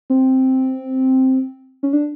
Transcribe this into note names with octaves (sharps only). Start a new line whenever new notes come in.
C4
C#4
D4